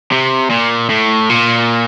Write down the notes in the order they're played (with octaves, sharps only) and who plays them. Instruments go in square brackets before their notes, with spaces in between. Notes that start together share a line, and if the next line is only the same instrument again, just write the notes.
[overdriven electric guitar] C3
A#2
A2
A#2